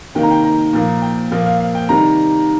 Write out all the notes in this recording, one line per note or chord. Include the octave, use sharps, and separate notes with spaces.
C3 D#3 A#3 G5
A#5
G5
A#5
A#2 F3 A#3
G5
A#2 F3 A#3 F5
F5
F5
G5
C3 D#3 G3 A#5